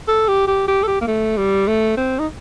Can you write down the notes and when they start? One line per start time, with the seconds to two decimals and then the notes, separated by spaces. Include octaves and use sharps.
0.08 A4
0.28 G4
0.47 G4
0.68 G4
0.83 A4
0.87 G4
1.01 A#3
1.07 A3
1.37 G3
1.67 A3
1.97 C4
2.19 D#4